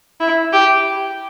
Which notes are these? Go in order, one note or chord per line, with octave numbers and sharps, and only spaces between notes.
E4
G4